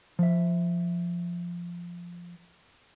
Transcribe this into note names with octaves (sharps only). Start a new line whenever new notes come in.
F3 E5